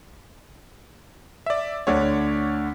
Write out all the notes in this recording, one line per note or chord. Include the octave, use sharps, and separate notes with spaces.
D5 E5
D2 D3 C#5 D5